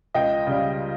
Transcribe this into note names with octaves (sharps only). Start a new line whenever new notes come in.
C#2 D#5 G5
C#3 G3